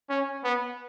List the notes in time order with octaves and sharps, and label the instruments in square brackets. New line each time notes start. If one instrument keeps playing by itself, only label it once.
[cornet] C#4
B3